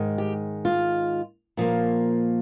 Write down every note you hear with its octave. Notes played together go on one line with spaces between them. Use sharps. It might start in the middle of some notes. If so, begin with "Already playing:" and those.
Already playing: G#2 D#3 G#3
G4
F4
A#2 F3 A#3